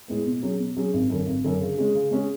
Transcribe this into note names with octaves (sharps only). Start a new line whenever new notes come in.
A2 G#3 B3
B2
F#3 C#4 G#4
B2
F#3 C#4 G#4
G#1
F#2 D3
G#1
F#2 D3
C#3
G#3 C#4 G#4
C#3
G#3 C#4 G#4